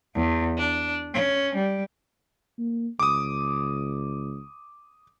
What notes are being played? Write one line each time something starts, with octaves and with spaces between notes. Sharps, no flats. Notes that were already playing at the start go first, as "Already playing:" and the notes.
E2
D4
C#4
G3
A#3
C#2 D6 D#6